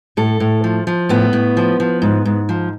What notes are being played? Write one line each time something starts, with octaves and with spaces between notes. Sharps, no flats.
A2 A4
A2
F3
F3
A2 B3
A2
F3
F3
G#2
G#2
F3